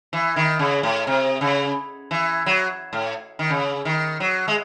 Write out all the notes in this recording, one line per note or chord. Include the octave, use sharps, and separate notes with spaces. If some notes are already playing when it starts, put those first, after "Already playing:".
E3
D#3
C#3
A2
C3
C#3
E3
F#3
A2
D#3
C#3
D#3
F#3
G#3